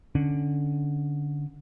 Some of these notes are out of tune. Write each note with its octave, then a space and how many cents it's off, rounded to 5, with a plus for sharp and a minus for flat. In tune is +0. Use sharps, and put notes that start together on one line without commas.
D3 +0 C#4 +0